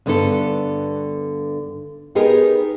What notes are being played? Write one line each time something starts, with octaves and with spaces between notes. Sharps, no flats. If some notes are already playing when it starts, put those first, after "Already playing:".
G2 D3 B3 D4 E4 A4
B3 D#4 G4 G#4 A#4 B4